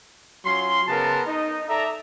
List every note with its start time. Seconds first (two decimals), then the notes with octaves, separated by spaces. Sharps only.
0.45 F#3 C#4 F4 C6
0.88 C#3 B3 A#4 B4 G#5 A5
1.27 D#4 D#5
1.69 A4 D5 E5 A#5